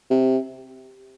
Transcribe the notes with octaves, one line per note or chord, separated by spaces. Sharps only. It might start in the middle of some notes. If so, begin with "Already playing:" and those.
C3